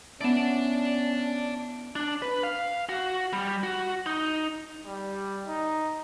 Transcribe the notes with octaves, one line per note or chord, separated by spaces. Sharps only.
B3 C#4 D4 E4 D5 A5
D4
B4
F5
F#4
G3
F#4
D#4
G3
D#4